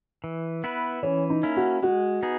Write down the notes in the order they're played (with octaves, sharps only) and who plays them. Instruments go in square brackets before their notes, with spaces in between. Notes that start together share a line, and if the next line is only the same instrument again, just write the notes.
[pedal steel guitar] E3
B3 E4 B4
[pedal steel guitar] E3 [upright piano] C#4
[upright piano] D#4
[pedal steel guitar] A#3 C#4 E4
[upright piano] F#4
[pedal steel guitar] G#3 [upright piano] F#4
[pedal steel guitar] B3 D#4 G#4